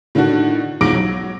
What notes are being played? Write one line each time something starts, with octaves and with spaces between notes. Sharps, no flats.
A2 D3 D#3 D4 F#4
B1 F2 G#2 D6 A#6 D7
F#3